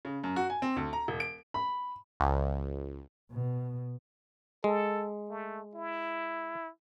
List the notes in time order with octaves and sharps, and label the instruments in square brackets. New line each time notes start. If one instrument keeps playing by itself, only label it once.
[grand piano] C#3
F#2
F#4
G#5
C4
D2
A#5
E1
D7
[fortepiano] B5
[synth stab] C#2
[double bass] B2
[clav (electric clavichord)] G#3 [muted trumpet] A4
[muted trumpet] A3
E4